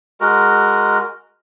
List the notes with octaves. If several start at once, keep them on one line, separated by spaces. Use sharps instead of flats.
G#3 F#4 A#4